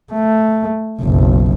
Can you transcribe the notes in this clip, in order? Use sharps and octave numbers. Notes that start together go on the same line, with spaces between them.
A3
F#1 B1